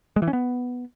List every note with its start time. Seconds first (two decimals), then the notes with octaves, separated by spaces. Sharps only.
0.16 G#3
0.22 E3
0.28 C#4
0.33 B3